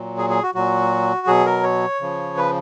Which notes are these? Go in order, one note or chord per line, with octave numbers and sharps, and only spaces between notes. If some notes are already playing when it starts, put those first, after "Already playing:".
Already playing: A#2 F#3
G#4
G#4
F#4
A#2 F#3 F#4
B2 F#3 G#4
A#4
C#5
C#3 F3
B4